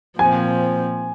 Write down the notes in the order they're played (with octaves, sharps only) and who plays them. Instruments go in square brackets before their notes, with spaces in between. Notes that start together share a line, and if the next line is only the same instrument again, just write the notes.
[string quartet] A#2 F3 C4 [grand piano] G#5